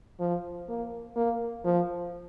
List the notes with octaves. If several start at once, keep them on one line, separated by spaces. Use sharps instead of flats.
F3
A#3
A#3
F3